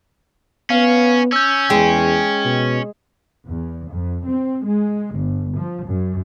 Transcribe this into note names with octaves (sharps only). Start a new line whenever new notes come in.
B3 C#4 F5
C#4 E6 G6
E2 G#3 G5
B2
E2
F2
C4
G#3
G1
F3
F#2